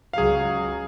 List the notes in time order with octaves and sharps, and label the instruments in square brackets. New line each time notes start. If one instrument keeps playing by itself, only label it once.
[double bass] C#2 F#3 [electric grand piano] G#4 F5